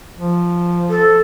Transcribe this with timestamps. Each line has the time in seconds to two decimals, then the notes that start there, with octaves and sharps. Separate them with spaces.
0.17 F3
0.90 A4